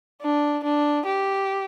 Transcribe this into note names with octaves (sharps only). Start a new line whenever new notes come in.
D4
D4
G4